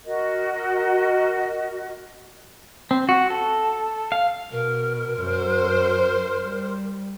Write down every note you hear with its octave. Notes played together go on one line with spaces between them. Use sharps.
F#4 A#4 D#5
C4
F#4
A4
F5
B2 A#4
F#2 F#3 C5
G3